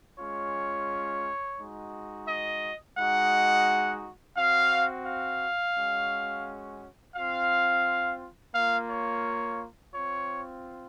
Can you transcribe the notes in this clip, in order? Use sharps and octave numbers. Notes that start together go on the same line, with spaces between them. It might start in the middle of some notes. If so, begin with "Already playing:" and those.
G#3 C#4 F4 C#5
G#3 D#4 F#4
D#5
G#3 D#4 F#4 F#5
C4 F#4 F5
F5
G#3 C#4 F#4
C4 F4 F5
A#3 F4 F5
C#5
C4 F4 C#5